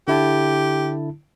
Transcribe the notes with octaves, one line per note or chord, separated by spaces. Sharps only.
D3 E4 G4 A5